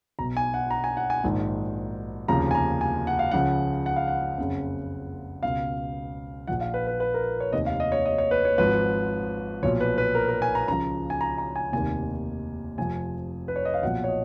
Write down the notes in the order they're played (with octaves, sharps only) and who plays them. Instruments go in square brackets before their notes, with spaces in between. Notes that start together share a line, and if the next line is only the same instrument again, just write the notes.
[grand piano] B1 A#5
B2
G#5
F#5
A#5
G#5
F#5
G#5
A#1 G#2 D#3
F1 D#2 C#3 F3 A#5
G#5
A#5
G#5
F#5
F5
C#2 C#3 F3 F#5
F#5
F5
F#5
F#1 F2 C#3
C#2 B2 F5
A#1 A#2 F3 F#5
F5
B4
B4
B4
A#4
C#5
F1 D#2 D#3 D#5
F5
D#5
C#5
D#5
C#5
B4
C#5
G#1 G#2 F3 B4
B1 A#2 F3 C#5
B4
B4
A#4
A#4
G#5
A#5
C#2 C#3 F3 A#5
G#5
A#5
A#5
G#5
F1 D#2 D#3 G#5
F1 F2 F3 G#5
B4
C#5
D#5
F5
B1 A#2 F3 F#5
C#5
D#5